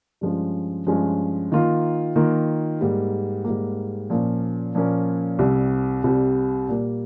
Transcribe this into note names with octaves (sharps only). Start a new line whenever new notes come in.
G2 F3 G#3 C#4
G2 F3 G#3 C#4
D#3 A#3 F4
D#3 A#3 F4
G#2 G3 A#3
G#2 G3 A#3
A#2 F3 A#3 C#4
A#2 F3 A#3 C#4
C2 C3 G3
C2 C3 G3
A#2 G3 A#3